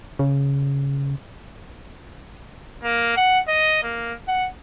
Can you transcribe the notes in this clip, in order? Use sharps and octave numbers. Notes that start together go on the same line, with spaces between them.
C#3
A#3
F#5
D#5
A#3
F#5